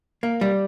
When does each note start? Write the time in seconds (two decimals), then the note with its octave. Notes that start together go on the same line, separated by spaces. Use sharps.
0.23 A#3
0.41 G3